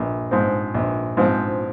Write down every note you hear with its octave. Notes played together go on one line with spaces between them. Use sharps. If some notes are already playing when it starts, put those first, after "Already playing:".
Already playing: A#1
G#2 F3 C4
A#1
G#2 F3 C4